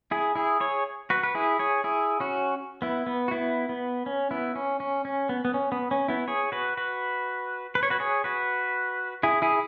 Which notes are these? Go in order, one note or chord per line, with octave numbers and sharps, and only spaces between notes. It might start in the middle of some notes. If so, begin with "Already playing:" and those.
E4 G#4
E4 G#4
G#4 C#5
F#4 B4
B4
E4 G#4
G#4 C#5
E4 G#4
C#4 F#4
B3 E4
B3
F#4
B3 E4
B3
C#4
B3 E4
C#4
C#4
C#4
B3
B3
C#4
B3
C#4
B3 E4
G#4 C#5
F#4 B4
F#4 B4
B4
C#5
F#4 B4
G#4 C#5
F#4 B4
E4 G#4
E4 G#4